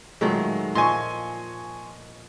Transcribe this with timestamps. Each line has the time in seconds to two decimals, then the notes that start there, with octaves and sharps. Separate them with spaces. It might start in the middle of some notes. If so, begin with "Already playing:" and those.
0.21 A#2 D#3 F#3 G#3 A3
0.75 A#2 F3 D#5 G#5 C6 C#6